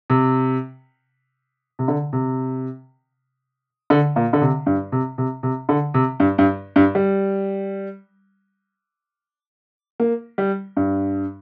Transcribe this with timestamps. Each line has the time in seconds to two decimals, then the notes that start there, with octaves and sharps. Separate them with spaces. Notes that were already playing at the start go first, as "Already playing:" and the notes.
0.10 C3
1.79 C3
1.88 D3
2.13 C3
3.90 D3
4.16 A#2
4.33 D3
4.41 C3
4.66 G2
4.92 C3
5.18 C3
5.43 C3
5.69 D3
5.94 C3
6.20 G2
6.38 G2
6.76 G2
6.95 G3
10.00 A#3
10.38 G3
10.77 G2